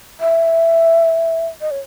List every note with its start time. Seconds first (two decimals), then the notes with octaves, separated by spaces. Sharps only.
0.20 E5
1.61 D#5
1.71 C#5